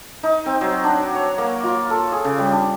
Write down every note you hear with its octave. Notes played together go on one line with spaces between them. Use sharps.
D#4
C4
F#3
D4
C#5
A#3
F4
A4
G#4
C#3
G3
D4